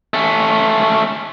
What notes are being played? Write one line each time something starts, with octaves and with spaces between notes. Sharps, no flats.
A3 C#4